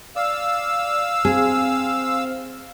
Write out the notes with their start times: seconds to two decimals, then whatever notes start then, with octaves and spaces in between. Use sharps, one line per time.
0.16 D5 F5 E6
1.25 C4 G#4